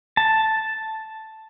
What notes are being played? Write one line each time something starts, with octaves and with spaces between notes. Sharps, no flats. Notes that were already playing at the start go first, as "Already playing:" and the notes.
A5